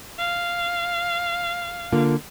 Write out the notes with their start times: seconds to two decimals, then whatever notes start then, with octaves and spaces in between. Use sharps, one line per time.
0.18 F5
1.92 D3 A#3 F4